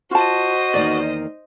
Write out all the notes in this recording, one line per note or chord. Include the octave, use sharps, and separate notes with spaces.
F4 F#4 C5 D#5 A5
E2 D#3 A#3 D5